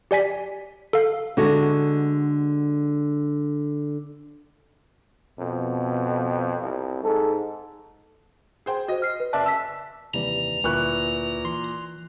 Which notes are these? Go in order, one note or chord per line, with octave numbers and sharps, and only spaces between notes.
G4 D5 G#5 B6
A4 F5
D3 G#3 F#4
F2 B2
C2
G#2 A4
G#4 C5 G5
F#4 C5 D#5
F6 C7
B4
F#1 D5 E5 A5 F#6
A5 E6 B6
D#2 C3 E3 G3 A#5
D2 A#2 E4 B4 C#6 F#6
E3 C6